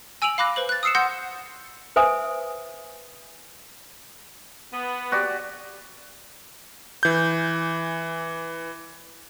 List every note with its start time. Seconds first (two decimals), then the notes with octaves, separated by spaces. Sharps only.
0.22 G#5 E6 D7 D#7 F7 F#7
0.38 F5 B5 D6 F#6 A#6
0.56 B4 C5 F#7
0.69 F#6 A6
0.83 D#6 E6 C7 C#7 E7
0.95 F#5 C6 E6 G6 A#6 C#7
1.96 B4 C5 E5 G#5 D#6
4.73 B3
5.12 F#4 G4 D5
7.03 E3 G6